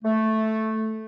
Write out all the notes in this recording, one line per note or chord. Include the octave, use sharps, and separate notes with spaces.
A3